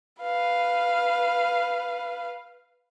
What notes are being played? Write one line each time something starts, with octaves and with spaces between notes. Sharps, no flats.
B4 F5